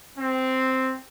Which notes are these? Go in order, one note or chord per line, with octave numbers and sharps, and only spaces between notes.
C4